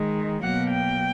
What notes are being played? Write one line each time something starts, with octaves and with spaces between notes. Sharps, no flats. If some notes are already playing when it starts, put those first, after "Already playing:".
Already playing: D#3 G#3
B2 F#3 A#3 F#5
G5